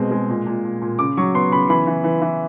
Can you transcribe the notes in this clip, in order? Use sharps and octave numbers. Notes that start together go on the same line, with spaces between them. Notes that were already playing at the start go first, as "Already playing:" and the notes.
Already playing: B2 G#3 C4
G#3
A#2
A#2
A#2
A#2
C#3 D6
F#3 C#6
B3 C6
C#3 B5
E3 B5
E3
E3
E3